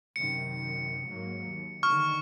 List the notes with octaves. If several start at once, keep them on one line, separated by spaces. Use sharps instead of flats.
F#2 C3 D#3 C#7
G#2 F#3 A#3
D#2
D3 D#3 C#6 F6